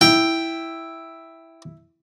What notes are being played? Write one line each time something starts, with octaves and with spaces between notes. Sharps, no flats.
E4 G5